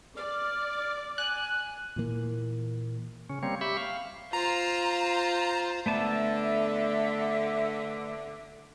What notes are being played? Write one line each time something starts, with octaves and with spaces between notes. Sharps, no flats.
D5 F6
G#5 F#6
A#2 E3 A#3
C#3 C#4
G3 A#3 C4 C#5
G4 E5 B5 C#6
F5
F4 C5 A#5
D3 A3 B3 E5 A5